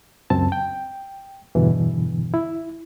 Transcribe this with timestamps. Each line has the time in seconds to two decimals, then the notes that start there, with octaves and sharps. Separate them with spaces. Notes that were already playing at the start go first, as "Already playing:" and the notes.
0.30 C#2 F#2 C4 A5
0.52 G5
1.55 E2 G2 B2 D3 E3
2.34 E4